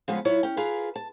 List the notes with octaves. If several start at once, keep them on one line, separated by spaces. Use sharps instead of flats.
F3 G3 G#3 B3 C#4 G#4
F#3 E4 F4 C#5
C#4 G5
F4 G#4 A#4 B4
A5